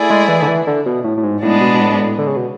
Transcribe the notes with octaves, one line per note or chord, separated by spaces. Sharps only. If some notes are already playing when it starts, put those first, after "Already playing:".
Already playing: A3 E4 G#4 D5
G#3
E3
D3
E3
D3
B2
A2
A2
G#2
A2 G#3 B3 D4
B2
B2
A2
G#2
A2
D3
C#3
B2